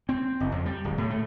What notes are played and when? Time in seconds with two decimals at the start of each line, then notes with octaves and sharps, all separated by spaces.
0.09 C4
0.40 F#1
0.52 F2
0.66 G3
0.84 D1
0.98 A2
1.10 A3